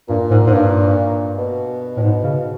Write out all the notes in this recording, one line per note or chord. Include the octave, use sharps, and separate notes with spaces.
G2 A#2
G#2
G#2
G2
B2
A2
G#2
C#3